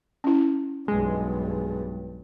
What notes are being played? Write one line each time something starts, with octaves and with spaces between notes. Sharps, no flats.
C#4 E4
B1 G2 G#3